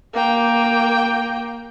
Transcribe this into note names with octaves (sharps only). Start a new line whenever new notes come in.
A#3 G5